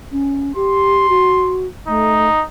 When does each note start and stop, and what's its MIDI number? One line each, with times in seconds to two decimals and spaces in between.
0.12 0.55 61
0.55 1.07 67
0.55 1.56 84
1.09 1.67 66
1.88 2.29 57
1.88 2.43 63